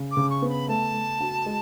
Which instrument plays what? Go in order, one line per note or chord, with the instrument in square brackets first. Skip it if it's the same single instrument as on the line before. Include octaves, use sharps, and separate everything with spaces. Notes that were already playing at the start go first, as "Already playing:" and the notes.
Already playing: [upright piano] C#3
[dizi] D6
[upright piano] C#3
[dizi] C#6
[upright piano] B3
[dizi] B5
[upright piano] A3 [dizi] A5
[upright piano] A3
F#4
G#3